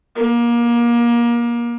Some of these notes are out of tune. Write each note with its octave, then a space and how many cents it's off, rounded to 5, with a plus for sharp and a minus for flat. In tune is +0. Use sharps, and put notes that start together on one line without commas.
A#3 +25